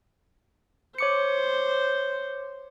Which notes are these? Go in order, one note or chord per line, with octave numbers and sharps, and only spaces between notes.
C5 C#5 D6 C#7